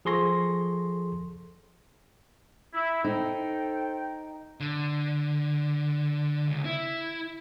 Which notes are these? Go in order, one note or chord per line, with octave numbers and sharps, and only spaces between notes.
F3 G#4 A4 C6 C#6 A#6
E4
D#4 A4 C5 G5
D3
C#2
E4